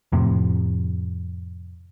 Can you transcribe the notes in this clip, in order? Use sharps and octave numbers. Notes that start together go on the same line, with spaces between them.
F2 A2 C3